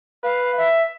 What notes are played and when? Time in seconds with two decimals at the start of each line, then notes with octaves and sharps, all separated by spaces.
0.24 B4 F5
0.57 E5